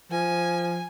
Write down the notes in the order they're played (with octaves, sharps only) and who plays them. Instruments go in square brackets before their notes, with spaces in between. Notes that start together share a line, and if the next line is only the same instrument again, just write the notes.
[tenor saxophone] F3 [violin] G#5